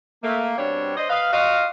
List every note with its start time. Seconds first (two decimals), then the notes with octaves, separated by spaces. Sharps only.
0.24 A3 A#3
0.57 B2 G3 C4 D4 C#5
0.97 D4 C5 D#5
1.10 B4 D#5 F5
1.33 F4 F#4 D#5 F5